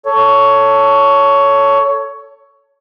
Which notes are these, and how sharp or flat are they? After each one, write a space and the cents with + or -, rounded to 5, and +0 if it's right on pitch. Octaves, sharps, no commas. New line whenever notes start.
A4 +10 C#5 +15